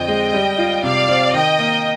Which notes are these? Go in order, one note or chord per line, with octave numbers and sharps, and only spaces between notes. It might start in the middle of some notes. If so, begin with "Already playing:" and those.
Already playing: F2 D3 C4 D#5 G5
G#3
G3
F4
C3 D5 F5
C4
D#3 D#5 G5
A#3